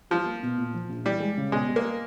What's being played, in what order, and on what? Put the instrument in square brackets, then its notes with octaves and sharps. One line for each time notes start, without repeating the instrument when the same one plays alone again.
[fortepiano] F3 [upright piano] G3
[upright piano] A#3
B2
A#2
F3
A#1
[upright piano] E3 [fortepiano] G3
[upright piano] G#3
C#3
[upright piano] B2 [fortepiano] G#3
[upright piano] G3
[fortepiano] A#3